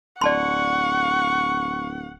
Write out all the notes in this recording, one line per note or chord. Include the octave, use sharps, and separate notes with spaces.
D1 D5 F#5 A5 C6 C#6